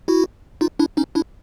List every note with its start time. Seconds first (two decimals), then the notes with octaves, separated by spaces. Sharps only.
0.08 E4 F#4
0.61 D#4 F4
0.79 D4 E4
0.97 C#4 D#4
1.15 D4 E4